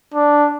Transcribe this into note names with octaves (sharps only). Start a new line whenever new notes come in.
D4